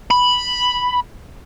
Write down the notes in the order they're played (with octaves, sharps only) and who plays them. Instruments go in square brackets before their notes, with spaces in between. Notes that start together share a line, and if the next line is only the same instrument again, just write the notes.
[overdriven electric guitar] B5